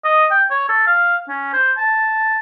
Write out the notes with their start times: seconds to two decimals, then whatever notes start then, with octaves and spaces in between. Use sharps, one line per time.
0.05 D#5
0.31 G5
0.51 C#5
0.69 A4
0.87 F5
1.29 C#4
1.53 C5
1.78 A5